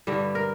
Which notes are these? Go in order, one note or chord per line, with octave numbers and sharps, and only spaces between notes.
G2 D3 G3
A#4